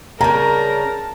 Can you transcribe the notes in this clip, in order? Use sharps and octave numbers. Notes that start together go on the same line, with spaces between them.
C#3 G3 A#4 A5 A#5